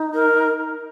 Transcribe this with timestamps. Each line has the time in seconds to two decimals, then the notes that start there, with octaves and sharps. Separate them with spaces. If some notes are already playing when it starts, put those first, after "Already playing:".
Already playing: D#4
0.14 A#4